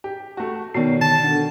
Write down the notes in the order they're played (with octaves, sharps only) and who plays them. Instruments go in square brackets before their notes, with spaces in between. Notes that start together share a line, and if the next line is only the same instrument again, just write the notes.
[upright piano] G4
A3 F#4
[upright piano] B2 D#3 [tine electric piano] B3 C7 [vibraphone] C#5 D5
[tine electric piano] D3 [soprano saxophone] A5
[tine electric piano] D4 [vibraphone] A4 F#5